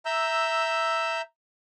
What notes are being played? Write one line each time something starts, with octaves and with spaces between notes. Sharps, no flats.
E5 A#5 E6 G6